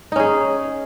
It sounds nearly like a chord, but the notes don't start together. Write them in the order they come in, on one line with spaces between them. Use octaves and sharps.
D#4 C#4 G#4